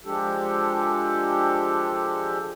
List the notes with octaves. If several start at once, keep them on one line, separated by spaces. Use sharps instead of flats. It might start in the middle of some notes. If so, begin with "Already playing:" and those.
F3 G#3 D4 G4 A4